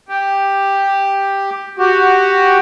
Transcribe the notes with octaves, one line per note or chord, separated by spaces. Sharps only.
G4
F#4 G4